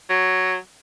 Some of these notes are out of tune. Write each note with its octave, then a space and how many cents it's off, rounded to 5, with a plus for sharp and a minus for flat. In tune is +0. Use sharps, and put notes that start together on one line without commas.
F#3 +5